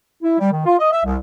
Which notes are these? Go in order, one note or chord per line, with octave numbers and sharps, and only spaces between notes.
E4
G3
D#3
F4
D#5
E5
C2